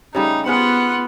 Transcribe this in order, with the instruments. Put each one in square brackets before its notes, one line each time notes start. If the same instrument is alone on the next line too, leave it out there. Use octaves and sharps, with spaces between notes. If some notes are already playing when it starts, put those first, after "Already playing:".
[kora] C#3 G3 A3 [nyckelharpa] D#4
[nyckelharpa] B3 [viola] F4 F#5 [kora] G#4 B4 C5